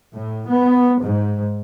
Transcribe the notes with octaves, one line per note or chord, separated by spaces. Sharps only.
A2
B3
G#2